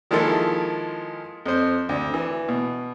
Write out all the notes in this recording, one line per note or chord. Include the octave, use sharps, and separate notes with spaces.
D#3 F3 G#3 A#3 E4 A4
F2 C5
D2
E3
B2